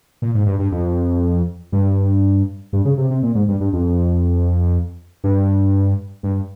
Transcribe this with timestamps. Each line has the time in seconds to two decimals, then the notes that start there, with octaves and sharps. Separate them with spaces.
0.22 A#2
0.34 G#2
0.46 G2
0.59 G2
0.72 F2
1.72 G2
2.73 G2
2.85 C#3
2.98 C3
3.10 C3
3.23 A#2
3.35 G#2
3.48 G2
3.60 G2
3.73 F2
5.24 G2
6.23 G2